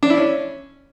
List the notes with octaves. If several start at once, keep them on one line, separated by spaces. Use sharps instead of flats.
D4
E4
C#4